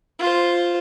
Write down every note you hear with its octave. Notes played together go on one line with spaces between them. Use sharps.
F4 C5